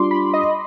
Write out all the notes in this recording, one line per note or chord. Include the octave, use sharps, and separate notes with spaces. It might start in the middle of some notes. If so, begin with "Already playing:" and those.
Already playing: G3 D4 F4 C6 D6
B5
D#5